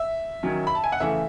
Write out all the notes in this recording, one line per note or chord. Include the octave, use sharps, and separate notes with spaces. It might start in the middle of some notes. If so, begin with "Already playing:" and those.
Already playing: E5
D#3 F#3 C#4
B5
A5
G#5
F#5
C#3 E3 A3 E5